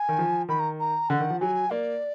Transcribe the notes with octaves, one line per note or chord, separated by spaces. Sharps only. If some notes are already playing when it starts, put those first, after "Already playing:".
Already playing: G#5
D#3
F3
D#3 B5
A#5
A#5
D3 F#5
D#3
F3
F#3 G#5
A#3 D5